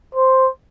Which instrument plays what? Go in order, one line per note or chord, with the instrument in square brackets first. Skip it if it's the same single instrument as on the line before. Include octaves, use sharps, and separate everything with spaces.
[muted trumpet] C5